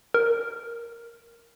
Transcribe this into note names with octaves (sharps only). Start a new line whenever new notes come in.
A#4